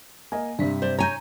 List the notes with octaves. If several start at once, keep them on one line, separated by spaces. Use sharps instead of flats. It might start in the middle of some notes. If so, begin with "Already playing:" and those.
A#3 D#5 G#5
G2 C3 D4 B6
C5 D5
C#5 G#5 A#5 G6